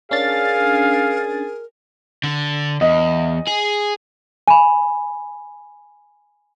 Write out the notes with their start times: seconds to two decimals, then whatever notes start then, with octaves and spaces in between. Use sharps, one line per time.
0.11 C#4 D4 G#4 A#4 F5 A6
2.24 D3
2.81 E2 D#5
3.47 G#4
4.48 G#5 B5